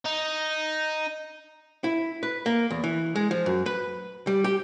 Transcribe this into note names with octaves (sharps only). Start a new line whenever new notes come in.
D#4
E4
B4
A#3
E2
E3
G#3
F3
F#2
B4
G3
G4